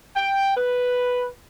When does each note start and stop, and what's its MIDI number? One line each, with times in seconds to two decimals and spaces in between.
0.16 0.54 79
0.56 1.27 71